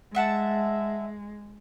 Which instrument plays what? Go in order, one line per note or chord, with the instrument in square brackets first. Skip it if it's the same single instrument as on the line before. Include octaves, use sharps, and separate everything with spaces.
[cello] G#3 [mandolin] E5 F#5 A5